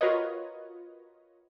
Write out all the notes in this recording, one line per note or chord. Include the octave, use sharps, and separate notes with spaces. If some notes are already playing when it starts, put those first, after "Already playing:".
F4 F#4 A#4 B4 C#5 D#5